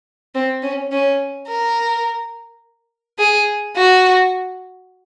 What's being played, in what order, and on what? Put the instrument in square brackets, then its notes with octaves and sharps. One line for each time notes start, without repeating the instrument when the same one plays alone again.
[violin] C4
C#4
C#4
A#4
G#4
F#4